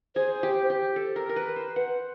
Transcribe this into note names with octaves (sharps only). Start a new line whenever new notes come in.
G#4 C5
G4
G4
A4
A#4
A#4
B4
C5
B4 F#5